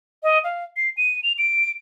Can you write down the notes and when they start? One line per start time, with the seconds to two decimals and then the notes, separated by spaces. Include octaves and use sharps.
0.23 D#5
0.44 F5
0.77 C7
0.97 D#7
1.23 F7
1.38 D7